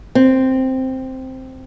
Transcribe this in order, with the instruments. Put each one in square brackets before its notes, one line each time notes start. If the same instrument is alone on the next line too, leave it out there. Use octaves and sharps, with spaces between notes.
[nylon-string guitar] C4